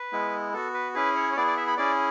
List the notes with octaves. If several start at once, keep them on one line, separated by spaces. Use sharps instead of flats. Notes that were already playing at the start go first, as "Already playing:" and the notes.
Already playing: B4
G#3 B3 E4
B3 F#4 A4
B4
C#4 E4 G#4 B4
C#5
C#5
B3 E4 G#4 D5
D5
E5
B5
C#4 E4 G#4 D5